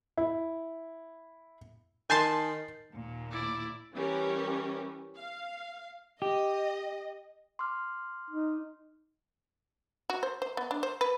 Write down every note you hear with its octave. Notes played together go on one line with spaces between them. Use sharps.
E4
D#3 G#5 A5 C6 G6 A6 C7
D#2 A#2
E4 D5
E3 G3 C#4 G4 A#4
F5
G4 D#5
C6 D6 F6
D#4
F#4
C5
C5
B3
D4
C5
B4